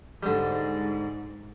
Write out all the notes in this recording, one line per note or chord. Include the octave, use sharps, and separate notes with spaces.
G#2 D3 G3